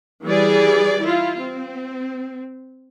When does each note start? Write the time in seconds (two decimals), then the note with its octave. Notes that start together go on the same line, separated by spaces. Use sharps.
0.24 E3 G3 G#4 D5
1.02 E4 F4
1.40 C4